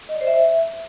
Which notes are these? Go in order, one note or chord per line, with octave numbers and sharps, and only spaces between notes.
D#5
D5
C5
E5